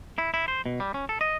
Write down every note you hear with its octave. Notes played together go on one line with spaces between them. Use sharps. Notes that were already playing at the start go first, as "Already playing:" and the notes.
E4
E4
C5
B2
G3
C#4
A4
D#5